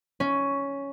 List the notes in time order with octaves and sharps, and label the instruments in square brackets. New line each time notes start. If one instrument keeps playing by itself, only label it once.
[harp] C#4